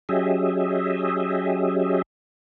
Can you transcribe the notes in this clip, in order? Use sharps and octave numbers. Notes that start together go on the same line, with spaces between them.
F#3 C#4 G4 G#4 D#5 E5